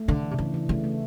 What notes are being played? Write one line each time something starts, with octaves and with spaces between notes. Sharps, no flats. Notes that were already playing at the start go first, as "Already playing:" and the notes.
Already playing: A3
D3 D4
E3
C3
C#3 E3
E3
C#3 A3
A3